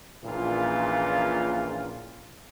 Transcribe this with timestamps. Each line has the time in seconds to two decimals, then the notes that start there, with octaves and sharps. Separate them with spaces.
0.25 A#1 A#2 C#3 E3 F4